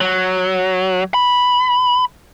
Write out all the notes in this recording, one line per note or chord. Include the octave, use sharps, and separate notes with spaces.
F#3
B5